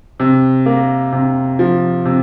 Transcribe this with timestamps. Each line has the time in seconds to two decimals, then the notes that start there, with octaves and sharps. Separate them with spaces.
0.20 C3
0.66 A#3
1.13 C3
1.59 F3
2.05 C3